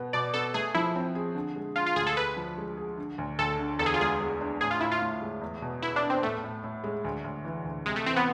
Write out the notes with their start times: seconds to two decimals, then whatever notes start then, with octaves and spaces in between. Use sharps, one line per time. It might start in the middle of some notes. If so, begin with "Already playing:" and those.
Already playing: B2 B3
0.13 B2 D5
0.34 B3 A4
0.54 A3 G#4
0.74 F3 E4
0.95 C4
1.15 G#4
1.35 D3
1.56 G#3
1.76 D4 F4
1.86 F4
1.96 D2 G#4
2.07 A4
2.16 G#4 B4
2.37 F3
2.58 G#3
2.77 G#4
2.97 D3
3.18 D2
3.39 D2 A4
3.59 D3
3.79 E2 A4
3.86 G#4
3.94 F4
4.00 G#3 G#4
4.21 G#3
4.41 D4
4.61 A2 G#4
4.71 F4
4.80 A2 E4
4.92 F4
5.02 A2
5.22 G#3
5.41 E2
5.62 B2
5.82 B3 E4
5.96 D4
6.03 B3
6.10 C4
6.23 A2 A3
6.44 A2
6.64 A2
6.84 G#3
7.05 D2
7.25 D2
7.45 E3
7.65 D2
7.86 C3 G#3
7.96 A3
8.06 E3 C4
8.16 B3